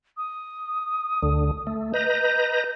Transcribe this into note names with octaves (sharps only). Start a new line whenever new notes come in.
D#6
D2 D3
A3
B4 D#5 A#5 G6